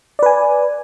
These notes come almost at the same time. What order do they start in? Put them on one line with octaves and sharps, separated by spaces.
D5 B4 G#5